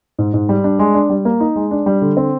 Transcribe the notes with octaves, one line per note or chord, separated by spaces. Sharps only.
G#2
G#2
G3
D4
G#3
D4
G3
A#3
D#4
G#3
D4
G3
D3
C4